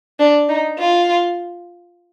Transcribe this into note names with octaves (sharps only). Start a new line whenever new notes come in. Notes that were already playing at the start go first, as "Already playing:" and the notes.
D4
D#4
F4